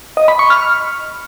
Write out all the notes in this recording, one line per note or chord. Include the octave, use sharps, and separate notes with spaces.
D#5
B5
C#6
F6